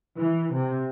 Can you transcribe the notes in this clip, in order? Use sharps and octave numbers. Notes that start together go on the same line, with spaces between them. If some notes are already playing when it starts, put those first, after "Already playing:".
E3
C3